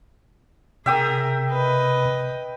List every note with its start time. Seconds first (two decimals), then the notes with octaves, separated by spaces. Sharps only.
0.86 C3 G#4 A#4 E5 G5 D#6
1.51 B4 D#5